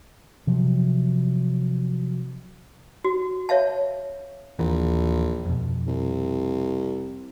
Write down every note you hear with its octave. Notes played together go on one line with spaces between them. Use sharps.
C3 F3 F#3
F#4
C#5 E5 F5 A5
A#1 D#2 D#3 E3
F2 B2
C2